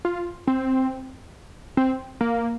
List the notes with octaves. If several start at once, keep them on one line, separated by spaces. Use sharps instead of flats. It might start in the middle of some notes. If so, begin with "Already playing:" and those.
F4
C4
C4
A#3